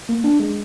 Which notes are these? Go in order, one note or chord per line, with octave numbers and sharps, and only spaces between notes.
A#3
D4
G#3